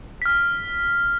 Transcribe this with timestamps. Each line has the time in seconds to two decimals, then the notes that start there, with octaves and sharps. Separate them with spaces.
0.22 F6 B6